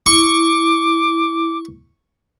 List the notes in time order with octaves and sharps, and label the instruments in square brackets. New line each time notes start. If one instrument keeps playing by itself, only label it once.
[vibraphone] E4 [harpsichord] C#6 [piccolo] D6